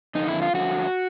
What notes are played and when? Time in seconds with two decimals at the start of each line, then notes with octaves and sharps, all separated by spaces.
0.15 F2 D3 D#4
0.28 E4
0.42 F4
0.54 F2 D3 F#4